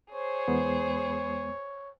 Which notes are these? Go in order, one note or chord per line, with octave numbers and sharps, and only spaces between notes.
G#4 C5 C#5
E2 G#3 B3